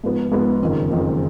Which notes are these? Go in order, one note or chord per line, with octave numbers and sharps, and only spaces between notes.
G#2 F3 B3
G#2 F3 B3
F#1 F2 D#3
F#1 F2 D#3